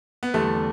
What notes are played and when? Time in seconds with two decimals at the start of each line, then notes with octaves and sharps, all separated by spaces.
0.23 B3
0.34 E2 D3 G3 A3